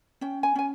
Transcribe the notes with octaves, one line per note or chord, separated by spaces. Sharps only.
C#4 G5
G#5
C#4 G#5